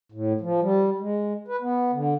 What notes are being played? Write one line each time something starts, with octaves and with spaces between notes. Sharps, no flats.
A2
F3
G3
G#3
B4
B3
D3